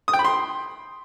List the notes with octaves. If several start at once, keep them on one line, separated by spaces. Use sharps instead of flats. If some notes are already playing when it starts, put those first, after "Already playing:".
D#6
G5
B5
C6